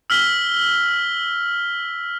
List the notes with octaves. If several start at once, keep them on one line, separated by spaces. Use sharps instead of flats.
E6 F6 B6 G7